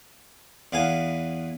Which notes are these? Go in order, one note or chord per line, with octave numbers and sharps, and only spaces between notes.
E2 B3 F5 G#5